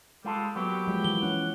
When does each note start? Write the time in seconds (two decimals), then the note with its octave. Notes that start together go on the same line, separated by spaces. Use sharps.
0.24 G3 G#3 F4 A4
0.56 F#3 A#3 B3 G4
0.87 F3 G#3
1.04 E3 G7
1.23 C#4 F#5